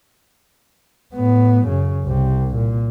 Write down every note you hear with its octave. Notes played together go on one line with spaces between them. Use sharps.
A2 B3
F#2 C#3
C2 C3
A#2